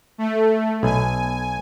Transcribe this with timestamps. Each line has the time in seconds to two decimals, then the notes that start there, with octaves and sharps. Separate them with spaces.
0.18 A3
0.83 B1 G#5